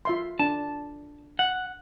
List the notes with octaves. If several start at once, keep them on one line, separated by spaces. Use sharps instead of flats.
F4 E5 C6
D4 A5
F#5